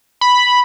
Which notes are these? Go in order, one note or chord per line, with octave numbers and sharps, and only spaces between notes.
B5